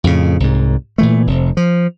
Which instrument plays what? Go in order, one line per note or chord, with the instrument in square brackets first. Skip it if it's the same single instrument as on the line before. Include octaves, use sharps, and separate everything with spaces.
[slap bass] F2 A2 C#3
C2 G#2
A#2 E3 A3
F1 C3
F3